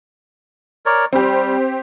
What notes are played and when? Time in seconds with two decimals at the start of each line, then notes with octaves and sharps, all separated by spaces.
0.86 A#4 C#5 D5
1.13 G3 C4 G4